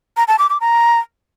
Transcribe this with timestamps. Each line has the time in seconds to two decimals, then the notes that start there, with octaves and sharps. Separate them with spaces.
0.17 A#5
0.28 A5
0.39 D6
0.50 D6
0.61 A#5